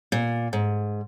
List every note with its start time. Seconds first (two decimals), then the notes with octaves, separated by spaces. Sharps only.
0.12 A#2
0.53 G#2